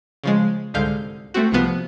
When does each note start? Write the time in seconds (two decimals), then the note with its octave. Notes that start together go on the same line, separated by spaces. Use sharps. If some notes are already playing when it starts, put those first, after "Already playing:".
0.24 C#3 F3 G#3
0.74 C2 G#2 D3 F5 G6
1.34 A3 C4 F#4
1.52 C2 C3 F3 B3